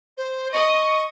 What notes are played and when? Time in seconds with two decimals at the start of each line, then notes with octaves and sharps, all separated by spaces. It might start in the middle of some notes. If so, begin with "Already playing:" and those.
0.17 C5
0.52 D#5 C#6